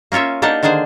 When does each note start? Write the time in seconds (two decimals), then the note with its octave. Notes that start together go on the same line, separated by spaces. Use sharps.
0.12 A#3 C#4 F4 C#5 E5
0.42 A#3 D4 D#4 G4 F#5 A5
0.63 D3 D#3 D4 G#4 C5